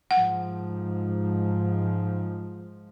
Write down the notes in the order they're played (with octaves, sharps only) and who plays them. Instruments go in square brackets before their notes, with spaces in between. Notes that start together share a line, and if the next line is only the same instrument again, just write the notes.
[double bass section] G#2 F3 [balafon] F#5